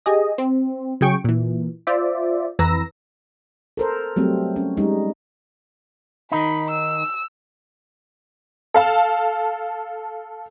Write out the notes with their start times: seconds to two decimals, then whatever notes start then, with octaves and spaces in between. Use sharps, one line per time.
0.06 G4 G#4 D#5
0.38 C4
1.01 C#3 F#3 G#4 G5 C#6 D7
1.24 A#2 E3
1.87 F4 C5 D5 E5
2.59 F2 E3 B4 A#5 E6 A#6
3.77 A4 A#4 C5
4.16 F#3 G3 A3 C4
4.56 C#4
4.77 G3 G#3 D#4
6.32 D#3 D#4 B5
6.70 E6
8.74 A4 F5 A5